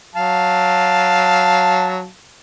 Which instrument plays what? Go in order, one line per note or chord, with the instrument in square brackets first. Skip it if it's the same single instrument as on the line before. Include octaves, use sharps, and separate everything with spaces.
[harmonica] F#3 F5 A5